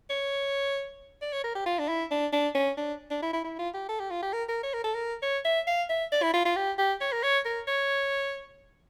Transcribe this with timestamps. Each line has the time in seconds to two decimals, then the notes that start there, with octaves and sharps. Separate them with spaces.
0.10 C#5
1.22 D5
1.33 C#5
1.44 A#4
1.55 G4
1.66 F4
1.79 D4
1.88 E4
2.11 D4
2.33 D4
2.55 C#4
2.77 D4
3.11 D4
3.22 E4
3.33 E4
3.44 E4
3.59 F4
3.74 G4
3.89 A4
4.00 G4
4.11 F4
4.22 G4
4.33 A#4
4.48 A#4
4.63 C#5
4.74 A#4
4.84 A4
4.94 A#4
5.22 C#5
5.45 E5
5.67 F5
5.89 E5
6.12 D5
6.22 E4
6.34 F4
6.45 F4
6.56 G4
6.78 G4
7.01 C#5
7.12 A#4
7.23 C#5
7.45 A#4
7.67 C#5